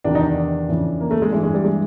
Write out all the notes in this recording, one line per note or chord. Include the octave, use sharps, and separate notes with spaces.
E2 C3 D#3 D4
D#4
D4
F2 C#3 E3
A#3
A3
G#3
G2 E3 G#3
G#3
G3
G#3